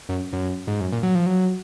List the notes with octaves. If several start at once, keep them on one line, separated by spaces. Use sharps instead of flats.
F#2
F#2
G#2
F#2
A#2
F#3
F3
F#3